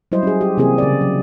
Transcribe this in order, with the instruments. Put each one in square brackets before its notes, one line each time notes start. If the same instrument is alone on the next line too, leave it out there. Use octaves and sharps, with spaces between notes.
[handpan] F#3 G3 E4 C5 D#5
C#4 G#4
G4
C3 E3 A#3 C4 G4 G#4
C#3 D5
F#3